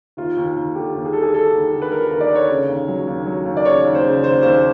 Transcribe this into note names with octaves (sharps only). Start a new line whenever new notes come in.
D#2 F4
D#2
D#2
D3 G4
D#2
G#4
G3 A4
G#4
G3 A4
D#2
D3
B4
G3 A#4
D#2 A#4
D5
D3 C#5
C#3
D#2
F#3
D#2
F#3
D#2
D5
C#3 C#5
D#2
C5
C#3
D#2 C5
D#2 C5